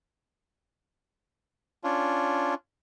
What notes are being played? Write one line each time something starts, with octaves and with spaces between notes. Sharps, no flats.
C#4 D4 F4